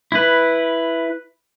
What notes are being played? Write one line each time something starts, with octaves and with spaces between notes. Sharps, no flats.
E4 B4